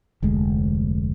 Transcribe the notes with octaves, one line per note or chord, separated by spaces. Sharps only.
F1 D2 G#3